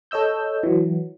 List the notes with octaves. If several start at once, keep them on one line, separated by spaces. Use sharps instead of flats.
A4 C#5 D#5 E6 G6
E3 F#3